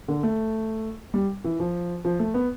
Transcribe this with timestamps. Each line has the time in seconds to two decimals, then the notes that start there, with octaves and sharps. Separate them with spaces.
0.08 D3
0.23 A3
1.14 G3
1.45 E3
1.60 F3
2.05 F3
2.19 A3
2.34 B3